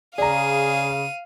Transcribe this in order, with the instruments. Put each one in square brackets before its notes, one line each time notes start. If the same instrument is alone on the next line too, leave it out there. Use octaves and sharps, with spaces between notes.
[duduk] C#3 [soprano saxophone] G#4 [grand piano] D5 A#5 [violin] F5 D#7